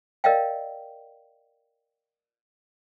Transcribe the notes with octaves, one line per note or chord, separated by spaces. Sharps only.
A#4 D5 D#5 F5 G5